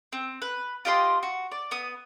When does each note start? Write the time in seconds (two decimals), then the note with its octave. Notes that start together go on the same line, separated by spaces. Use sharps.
0.12 C4
0.42 B4
0.85 F4 G4 D#5 C6
1.23 F#4
1.52 D5
1.71 B3 D#6